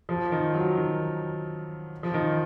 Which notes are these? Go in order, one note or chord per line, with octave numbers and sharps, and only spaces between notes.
F3
D#3
F#3
D#3
F3
D#3